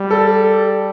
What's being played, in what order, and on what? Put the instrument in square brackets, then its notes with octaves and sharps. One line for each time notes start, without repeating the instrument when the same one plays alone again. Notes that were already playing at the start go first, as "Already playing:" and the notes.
Already playing: [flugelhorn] G3
[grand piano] A4